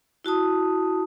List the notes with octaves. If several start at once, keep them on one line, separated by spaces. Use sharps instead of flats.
E4 F#4 A5 D#6